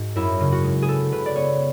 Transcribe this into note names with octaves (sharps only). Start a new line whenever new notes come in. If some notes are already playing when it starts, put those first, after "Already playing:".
Already playing: G#2 F#4
F#2 E4
C#3
F#4
G#3
G#4
B3 A4
C#3 B4
D5
B3 C#5